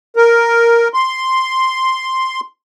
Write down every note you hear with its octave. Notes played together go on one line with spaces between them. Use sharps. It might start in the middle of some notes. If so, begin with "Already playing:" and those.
A#4
C6